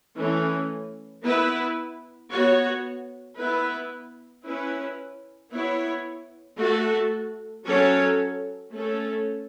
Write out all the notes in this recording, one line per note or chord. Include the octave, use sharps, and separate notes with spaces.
E3 A3 C#4
B3 E4 B4
B3 F#4 C#5
B3 E4 B4
C#4 E4 B4
B3 E4 C#5
A3 F#4 A4
F#3 C#4 A4 C#5
A3 C#4 A4